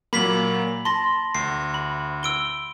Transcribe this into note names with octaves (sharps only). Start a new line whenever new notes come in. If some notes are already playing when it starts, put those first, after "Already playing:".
A#2 F#3 A#3 B5 B6 F#7
A5 C6 A#6
D2 C7
B5
E6 D7 G7